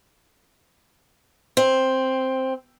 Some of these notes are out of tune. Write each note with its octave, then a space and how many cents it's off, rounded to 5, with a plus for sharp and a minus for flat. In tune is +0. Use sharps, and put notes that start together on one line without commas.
C4 +5